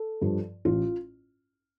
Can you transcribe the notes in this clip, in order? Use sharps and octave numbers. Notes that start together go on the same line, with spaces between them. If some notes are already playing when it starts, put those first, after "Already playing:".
Already playing: A4
G2 F3
A1 F4